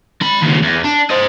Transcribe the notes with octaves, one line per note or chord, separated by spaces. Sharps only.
G#3 B5
D#2 C#3
E2
D4
C5 D#5